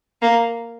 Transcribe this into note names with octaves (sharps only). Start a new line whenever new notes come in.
A#3